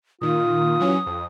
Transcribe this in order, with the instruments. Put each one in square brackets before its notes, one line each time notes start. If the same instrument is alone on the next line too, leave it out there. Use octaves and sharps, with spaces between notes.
[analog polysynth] A#2 D#3 [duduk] F4 [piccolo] D#6
[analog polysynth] E3 F#3 C#4
F2